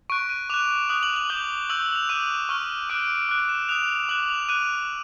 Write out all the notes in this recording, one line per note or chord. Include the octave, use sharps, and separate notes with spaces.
C#6 F#6 D7
D#7
D6 F#6 F7
D#6 F#6 F#7
F#7
F#7
D6 G6 G7
C#6 E6 G6 F#7
F#7
F7
D6 F#6 D#7
C#6 F6
D6 F#6 D7
D7
D7
D6 F#6
E7
D#6 F#6 F7
D6 F#6 F#7
F7
D6 F#6 D#7